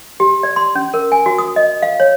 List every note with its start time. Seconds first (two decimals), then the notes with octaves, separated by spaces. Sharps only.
0.20 G4
0.43 D5
0.56 C6
0.75 C#4
0.94 A#4
1.12 G#5
1.26 F#4
1.38 D#6
1.56 D#5
1.82 F5
2.00 C#5